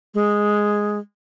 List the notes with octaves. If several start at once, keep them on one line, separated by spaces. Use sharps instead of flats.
G#3